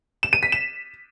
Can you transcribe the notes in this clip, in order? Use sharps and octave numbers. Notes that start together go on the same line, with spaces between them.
E7
D#7
B6
E7